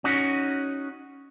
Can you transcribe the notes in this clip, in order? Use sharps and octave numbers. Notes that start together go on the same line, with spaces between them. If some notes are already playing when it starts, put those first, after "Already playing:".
C#4 D#4 F#4